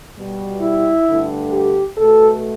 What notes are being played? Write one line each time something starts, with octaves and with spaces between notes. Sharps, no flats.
B2 G3
E4
G2 D3 A3
G4
B2 A3 A4